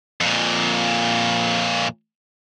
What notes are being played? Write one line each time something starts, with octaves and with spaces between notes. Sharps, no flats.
F2 A#2